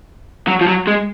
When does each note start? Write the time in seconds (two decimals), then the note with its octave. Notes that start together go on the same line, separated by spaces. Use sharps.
0.48 F#3
0.61 F3
0.67 F#3
0.87 G#3